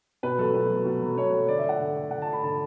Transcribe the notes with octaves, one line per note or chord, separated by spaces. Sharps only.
B2 B4
F#3 A3 A4
B2 B4
F#3 A3
B2
F#3 A3
B2 C#5
F#3 A3
D3 D5
E5
A3 F#5
D3
A3
D3 F#5
A5
A3
B5
D3 A5